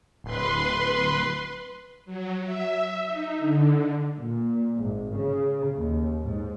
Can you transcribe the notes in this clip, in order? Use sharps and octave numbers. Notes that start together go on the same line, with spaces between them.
D1 B4 C6
F#3
E5
D#4
D3
A#2
G#1
C#3
D#2
G#2